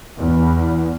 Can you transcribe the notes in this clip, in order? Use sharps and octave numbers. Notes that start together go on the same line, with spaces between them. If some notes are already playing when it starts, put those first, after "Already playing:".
E2